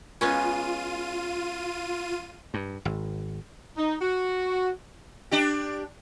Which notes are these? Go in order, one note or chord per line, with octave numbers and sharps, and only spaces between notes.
G#3 B3 C#4 F4 D#7
G2
G#1
D#4
F#4
D4 G4